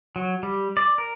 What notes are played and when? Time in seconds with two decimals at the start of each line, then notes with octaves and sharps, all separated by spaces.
0.16 F#3
0.43 G3
0.77 D5
0.98 A#4